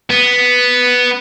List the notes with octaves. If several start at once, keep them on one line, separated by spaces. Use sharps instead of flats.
B3